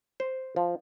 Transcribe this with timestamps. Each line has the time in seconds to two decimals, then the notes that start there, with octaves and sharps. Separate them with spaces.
0.20 C5
0.56 F3